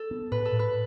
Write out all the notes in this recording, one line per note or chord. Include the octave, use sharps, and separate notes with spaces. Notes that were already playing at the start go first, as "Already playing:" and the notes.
Already playing: A4
B3
A2 B4
A4
A2
B4